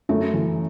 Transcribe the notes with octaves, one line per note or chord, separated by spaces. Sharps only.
F#2 A3
E3